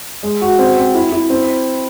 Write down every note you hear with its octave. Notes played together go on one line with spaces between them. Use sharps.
G#3
F#4
C4
C4
E4
E4
C4